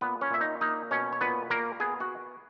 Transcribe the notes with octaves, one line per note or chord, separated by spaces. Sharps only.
A#2 B3 B4
C#4 C#5
A#2 E5
D#4 D#5
A#3 D#4 D#5
B2 C#4 C#5
C#5
A#2 B3 B4
A#2 A#3 A#4
B3 G#4 G#5
F#4 F#5